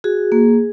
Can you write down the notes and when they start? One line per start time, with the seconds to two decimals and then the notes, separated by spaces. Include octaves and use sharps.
0.04 F#4 G#4
0.32 A#3